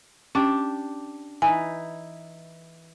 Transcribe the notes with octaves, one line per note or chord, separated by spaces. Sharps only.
C#4 D4 G4
E3 D#4 G#5